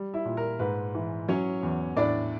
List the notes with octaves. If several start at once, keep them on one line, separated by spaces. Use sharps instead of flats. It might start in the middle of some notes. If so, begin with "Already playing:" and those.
Already playing: G3
E4 E5
A#2
A#4
G#2 B4
E3
F#3 C#4 C#5
E2
A2 D4 D5